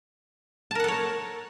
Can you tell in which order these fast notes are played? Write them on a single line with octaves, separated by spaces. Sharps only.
A5 A#4 F#5 A4 C#5